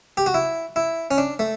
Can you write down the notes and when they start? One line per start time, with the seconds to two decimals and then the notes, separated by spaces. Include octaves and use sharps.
0.17 G4
0.26 F#4
0.34 E4
0.76 E4
1.11 C#4
1.18 D4
1.39 A3